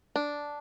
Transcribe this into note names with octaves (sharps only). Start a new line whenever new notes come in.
D4